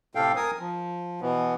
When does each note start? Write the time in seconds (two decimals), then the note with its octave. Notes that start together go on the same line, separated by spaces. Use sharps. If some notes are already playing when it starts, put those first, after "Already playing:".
0.15 A2 C3 A4 F5 G5
0.36 A#4 G#5 D#6
0.59 F3
1.21 B2 E3 B3